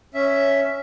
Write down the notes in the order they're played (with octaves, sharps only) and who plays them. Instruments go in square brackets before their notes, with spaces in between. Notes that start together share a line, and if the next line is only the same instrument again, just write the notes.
[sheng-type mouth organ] C#4 E5